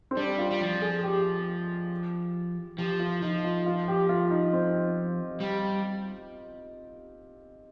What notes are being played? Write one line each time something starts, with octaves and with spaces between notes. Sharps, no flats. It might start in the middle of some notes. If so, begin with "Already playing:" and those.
C4
G3 D4
F4
G3
F3
G#4
G4
F3 G4
F4
F3 D#4
F4
F4
G4
F4
D#4
C4
G3